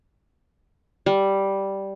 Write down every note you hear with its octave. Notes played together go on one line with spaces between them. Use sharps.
G3